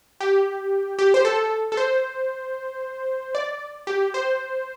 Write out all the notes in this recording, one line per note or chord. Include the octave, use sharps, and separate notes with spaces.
G4
G4
C5
A4
A4
C5
D5
G4
C5